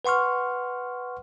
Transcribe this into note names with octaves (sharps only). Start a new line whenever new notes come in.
B4 F#5 C6 C#6 F6